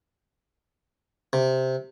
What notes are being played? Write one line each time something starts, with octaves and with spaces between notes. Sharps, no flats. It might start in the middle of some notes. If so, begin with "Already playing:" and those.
C3